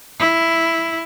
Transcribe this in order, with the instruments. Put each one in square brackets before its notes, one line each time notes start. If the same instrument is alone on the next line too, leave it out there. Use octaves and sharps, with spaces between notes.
[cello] E4